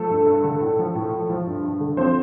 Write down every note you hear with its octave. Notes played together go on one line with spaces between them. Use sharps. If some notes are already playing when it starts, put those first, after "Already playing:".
Already playing: F3 A3 A4
G2
G2
D3
A2
F3
A2
F3
F3
G2
G2
D3
F3 C4 C5